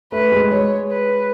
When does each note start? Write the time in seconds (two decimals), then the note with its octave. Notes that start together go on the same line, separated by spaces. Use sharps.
0.12 A3 B4
0.32 G#3
0.52 G#3 C#5
0.92 B4